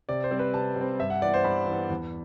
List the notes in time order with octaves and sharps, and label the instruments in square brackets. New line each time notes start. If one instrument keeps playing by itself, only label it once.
[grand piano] C3 D5
C5
G3 C4
B4
C3 A5
G3
C4
G2 E5
F#5
E3 B3 D5
C5
G2 B5
E3 B3
E2